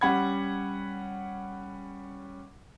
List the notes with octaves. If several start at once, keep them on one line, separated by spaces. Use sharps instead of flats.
G3 C#4 F#5 B5 G#6